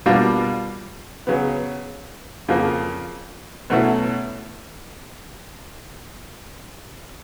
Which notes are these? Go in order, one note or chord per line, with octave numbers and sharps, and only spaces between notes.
B2 G3 A#3 D4 F4
C#3 F#3 B3
F2 C#3 F3 A#3
B2 F#3 A3 C#4 E4